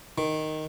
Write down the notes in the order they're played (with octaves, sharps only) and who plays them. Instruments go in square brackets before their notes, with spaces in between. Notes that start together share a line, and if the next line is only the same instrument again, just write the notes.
[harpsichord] D#3